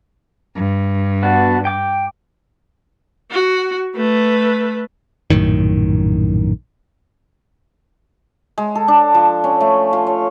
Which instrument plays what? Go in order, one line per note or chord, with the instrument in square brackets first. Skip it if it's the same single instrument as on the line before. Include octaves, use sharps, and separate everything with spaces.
[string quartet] G2
[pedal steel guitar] B3 D4 F#4
G5 D6
[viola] F#4
A3 B4
[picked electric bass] A#1 F#2 A2 D#3
[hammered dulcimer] G#3
A4
D4
F3
C#4
A3
F4
C#5